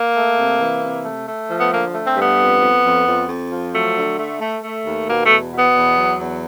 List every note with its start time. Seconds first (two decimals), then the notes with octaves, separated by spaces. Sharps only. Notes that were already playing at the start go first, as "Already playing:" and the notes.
Already playing: A#3
0.15 A3
0.38 C3
0.60 E3
0.82 C3
1.05 A3
1.27 A3
1.49 F3
1.60 B3
1.72 D3 A#3
1.94 A3
2.05 C4
2.17 G2
2.22 B3
2.39 F2
2.61 F2
2.83 F2
3.06 F2
3.28 F2
3.51 F3
3.73 F#3 A3
3.95 D3
4.18 A3
4.40 A3
4.62 A3
4.85 D#2
5.07 B2 A#3
5.24 A3
5.30 E2
5.52 B2
5.58 B3
5.74 E2
5.97 F#3
6.18 E2